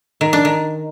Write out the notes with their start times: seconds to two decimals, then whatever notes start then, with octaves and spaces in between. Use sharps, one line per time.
0.21 D#3
0.33 D4
0.45 D#3